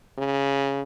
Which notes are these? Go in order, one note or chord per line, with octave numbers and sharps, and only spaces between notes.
C#3